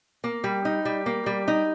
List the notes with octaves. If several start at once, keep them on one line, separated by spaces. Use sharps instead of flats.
A#3
G3
D#4
G3
A#3
G3
D#4